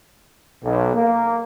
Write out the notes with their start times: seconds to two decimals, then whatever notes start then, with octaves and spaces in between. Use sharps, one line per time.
0.63 B1
0.94 A#3